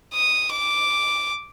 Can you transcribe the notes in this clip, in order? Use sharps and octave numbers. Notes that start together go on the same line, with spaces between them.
D#6
D6